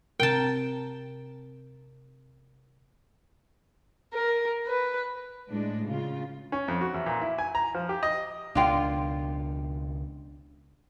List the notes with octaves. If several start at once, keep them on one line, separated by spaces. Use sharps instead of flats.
C3 A#4 G5 A5
A#4
B4
A2 G#3 D4
C#3 F4
C#4
F2
F#4
E2
A#2
E4
G#5
A#5
F3
G4
D#5
C#2 B2 D#3 D4 F4 F5 G5